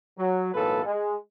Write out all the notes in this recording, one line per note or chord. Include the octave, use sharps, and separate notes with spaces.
F#3
B1 A2 E3 A#3 A4 B4
G#3